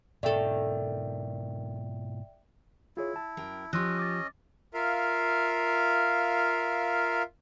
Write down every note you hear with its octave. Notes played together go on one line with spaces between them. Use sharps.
G#2 B2 D#3 A4 D5 E5 G5
E4 F4 G#4 C#5
A5
F#2 A#4 G5
F3 C#4 G4 D#5 C6 E6 F#6
D6 A6
F4 A#4 E5 F5